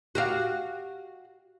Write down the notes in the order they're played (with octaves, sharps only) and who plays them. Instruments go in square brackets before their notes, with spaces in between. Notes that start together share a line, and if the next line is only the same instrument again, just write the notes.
[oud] F#4 G4 F5